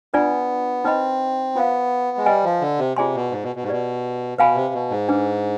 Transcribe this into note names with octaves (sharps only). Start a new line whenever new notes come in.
B3 D4 F4 B4 D5 G#5
C4 D#4 B4 D#5 B5
B3 F4 C5 F5
G#3
G3 B4 D#5 G#5
F3
D3
C3
C3 F4 G#4 D5 G#5 C6
B2
G#2
B2
B2
G#2
B2 G4 B4 D5
B2 B4 F5 G#5 B5
C3
B2
G#2
D4 G#4 B4